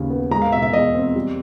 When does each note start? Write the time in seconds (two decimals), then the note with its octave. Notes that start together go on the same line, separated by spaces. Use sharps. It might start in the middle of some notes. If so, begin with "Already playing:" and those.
Already playing: D#2 C#3
0.10 B3
0.31 G#3 A#5
0.42 F5
0.52 B2 E5
0.62 E5
0.73 E2 D#5
0.94 C4
1.16 G3